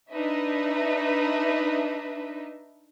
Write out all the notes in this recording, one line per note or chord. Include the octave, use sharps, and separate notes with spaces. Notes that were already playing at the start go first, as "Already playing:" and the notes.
D4 D#4 B4 D#5 E5